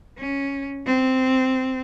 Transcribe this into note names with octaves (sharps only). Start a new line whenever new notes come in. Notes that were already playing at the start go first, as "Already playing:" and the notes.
C#4
C4